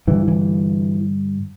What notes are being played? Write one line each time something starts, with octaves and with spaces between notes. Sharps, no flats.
G2 D3 E3
E3